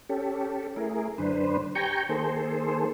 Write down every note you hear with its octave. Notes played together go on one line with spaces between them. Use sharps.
C#4 G4 A4
A3 E4 G#4 A#4
F#2 D3 D4 B4 C5
G4 G5 G#5 A#5 C#6 G6
D#3 A#3 G#4 A4 C5